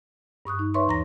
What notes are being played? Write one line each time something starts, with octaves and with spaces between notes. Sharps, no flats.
G2 C#6 D#6 F#6
D#4
B4 C#5 E5 C6 C#6
D#2 E3 A#5 A#6